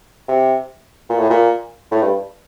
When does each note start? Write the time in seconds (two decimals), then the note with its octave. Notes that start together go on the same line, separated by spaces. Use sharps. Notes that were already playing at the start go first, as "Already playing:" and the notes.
0.29 C3
1.09 A#2
1.19 A2
1.30 A#2
1.91 A2
2.02 G2